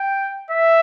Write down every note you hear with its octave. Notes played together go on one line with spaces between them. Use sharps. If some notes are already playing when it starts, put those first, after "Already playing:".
Already playing: G5
E5